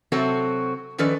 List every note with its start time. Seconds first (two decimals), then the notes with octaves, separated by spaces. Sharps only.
0.12 C3 F#3 C4 F#4 A4 A5
0.98 D#3 F3 C#4 A4 B4 D5